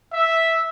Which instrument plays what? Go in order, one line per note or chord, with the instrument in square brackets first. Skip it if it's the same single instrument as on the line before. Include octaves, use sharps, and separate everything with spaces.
[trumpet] E5